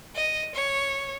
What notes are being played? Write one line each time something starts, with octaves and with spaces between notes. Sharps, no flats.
D#5
C#5